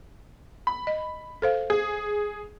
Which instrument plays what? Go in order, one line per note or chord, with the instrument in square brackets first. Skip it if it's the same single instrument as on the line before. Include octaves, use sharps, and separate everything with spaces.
[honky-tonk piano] B5
[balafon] D#5
A4 C5 F5
[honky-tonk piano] G#4